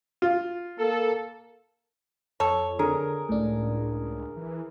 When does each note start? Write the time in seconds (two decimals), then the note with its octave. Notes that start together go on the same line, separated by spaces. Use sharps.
0.22 F4
0.79 A#3 A4
2.40 F2 A4 C#5
2.79 D3 G#4 A#4
3.29 C#2 A2 D4
4.36 E3